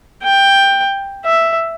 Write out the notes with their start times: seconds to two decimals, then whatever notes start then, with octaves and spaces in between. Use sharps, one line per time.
0.23 G5
1.25 E5